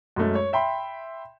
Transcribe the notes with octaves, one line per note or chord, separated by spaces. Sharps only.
F#2 G#3 A3 C#4
C#5
E5 G5 B5 C6